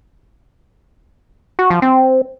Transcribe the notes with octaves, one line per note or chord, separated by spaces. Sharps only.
F#4
F3
C4